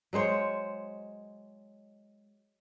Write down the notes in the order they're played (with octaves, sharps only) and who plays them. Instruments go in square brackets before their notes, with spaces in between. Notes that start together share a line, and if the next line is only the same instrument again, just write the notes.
[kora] F#3 G#3 C5 C#5